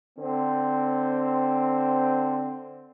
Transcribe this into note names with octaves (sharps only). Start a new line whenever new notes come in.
D3 C4